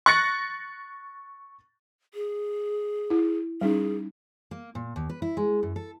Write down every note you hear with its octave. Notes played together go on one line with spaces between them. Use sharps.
C#6 F#6 A6 A#6 C#7
G#4
E4
G3 C#4 D#4 G#4
A#3
A#2
D#2
B4
E4
G#3
F#2
A4